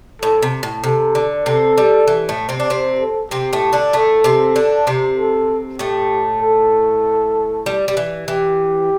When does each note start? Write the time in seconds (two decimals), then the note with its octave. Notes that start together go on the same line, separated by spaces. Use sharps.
0.22 A2 A4
0.42 C3
0.63 A2
0.84 C3 A4
1.15 D3
1.45 C3 C4 A4
1.78 G3
2.08 E3
2.29 A2 A3
2.49 C3 C4
2.60 D4
2.70 C3 C4 C5
3.00 A4
3.31 C3 C4 G4
3.53 A2 A3
3.73 D3 D4
3.93 A2 A3 A4
4.24 C3 C4
4.56 D3 D4
4.87 C3 C4
5.17 A4
5.79 A2 A3 G4
6.42 A4
7.66 G3
7.88 G3
7.97 E3
8.28 E3 G4